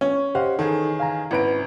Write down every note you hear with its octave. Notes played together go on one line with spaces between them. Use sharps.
C#4
G4 C5 D#5 F5 F#5
D#3 E3 D#4 G#4 A4
F5 G#5 A#5
G#1 C#4 E4 B4 A#5 D7